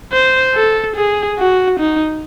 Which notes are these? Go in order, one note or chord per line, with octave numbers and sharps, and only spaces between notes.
C5
A4
G#4
F#4
D#4